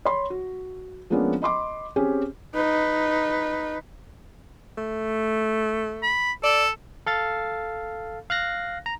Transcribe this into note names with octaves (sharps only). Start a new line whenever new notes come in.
C#5 B5 C6
F#4
F3 G#3 A#3 B3 C#4 D4
D#5 B5 C6 D6
C4 C#4 G4 G#4
D#4 B4
A3
B5
A4 D5
A4 F5 A6
F5 F#6 A#6
A#5